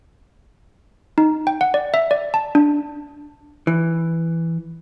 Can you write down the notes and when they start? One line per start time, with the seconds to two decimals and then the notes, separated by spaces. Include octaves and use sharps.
1.18 D#4
1.47 G5
1.61 F#5
1.74 D5
1.94 E5
2.11 D5
2.34 A5
2.55 D4
3.67 E3